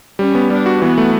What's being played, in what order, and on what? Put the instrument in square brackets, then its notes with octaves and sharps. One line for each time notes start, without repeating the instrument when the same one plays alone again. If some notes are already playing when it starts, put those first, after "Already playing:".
[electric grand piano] G3 [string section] C#4
[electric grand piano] B3
[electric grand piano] G3 [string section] D4
[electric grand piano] F#4
[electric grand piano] E3 [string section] B3
[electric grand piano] A3